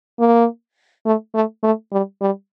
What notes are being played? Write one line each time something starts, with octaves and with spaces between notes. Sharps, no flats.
A#3
A3
A3
A3
G3
G3